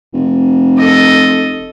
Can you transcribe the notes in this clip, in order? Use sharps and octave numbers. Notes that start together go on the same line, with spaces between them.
F1
A4 D#5